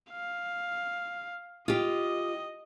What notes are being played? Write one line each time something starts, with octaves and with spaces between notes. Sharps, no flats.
F5
F4 G4 D#5